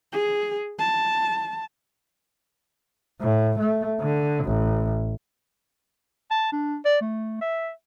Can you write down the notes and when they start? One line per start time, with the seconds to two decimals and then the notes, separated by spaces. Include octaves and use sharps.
0.13 G#4
0.79 A5
3.21 A2
3.58 A3
4.00 D3
4.44 A1
6.31 A5
6.53 D4
6.85 D5
7.01 A3
7.41 E5